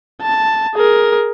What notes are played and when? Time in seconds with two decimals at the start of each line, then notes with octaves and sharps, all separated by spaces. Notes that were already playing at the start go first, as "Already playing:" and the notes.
0.22 A5
0.75 G#4 A#4